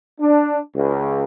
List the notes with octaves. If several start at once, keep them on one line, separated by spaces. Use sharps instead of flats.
D4
C#2